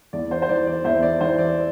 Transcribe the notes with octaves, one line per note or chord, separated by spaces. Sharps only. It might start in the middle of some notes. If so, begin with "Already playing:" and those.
E2 D5
C5
C5
E3 D5
D5
E2 C5 E5
D5
E3 C5
D5